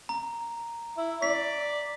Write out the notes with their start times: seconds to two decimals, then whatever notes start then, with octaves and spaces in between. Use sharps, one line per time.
0.09 A#5
0.98 E4
1.22 D5 B6